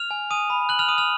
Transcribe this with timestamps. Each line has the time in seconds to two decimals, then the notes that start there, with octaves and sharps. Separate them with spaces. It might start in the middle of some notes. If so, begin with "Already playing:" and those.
Already playing: F6 F7
0.11 G#5
0.31 G#5 D#6 D#7
0.50 B5
0.69 F#6 F#7
0.79 F6 F7
0.88 D#6 D#7
0.98 F6 F7